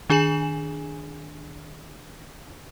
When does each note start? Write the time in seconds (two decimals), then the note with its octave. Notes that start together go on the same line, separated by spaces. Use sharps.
0.10 D#3 D4 G#4 G#5 E7 F#7